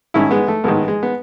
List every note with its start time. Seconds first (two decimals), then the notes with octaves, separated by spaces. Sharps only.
0.14 A1 G#2 D#3 C#4 E4
0.31 G#3 B3
0.48 A3
0.64 A1 G#2 D#3 G#3 B3
0.88 G#3
1.03 B3